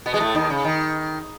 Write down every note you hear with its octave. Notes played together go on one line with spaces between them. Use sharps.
B2 B3
G#3
A2 A3
D#2 D#3
C#3
D#3